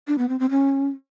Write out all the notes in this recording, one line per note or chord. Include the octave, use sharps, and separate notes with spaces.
D4
B3
C4
C4
C#4